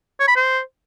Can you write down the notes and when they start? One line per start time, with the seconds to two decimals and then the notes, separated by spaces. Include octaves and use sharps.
0.20 C#5
0.28 B5
0.36 C5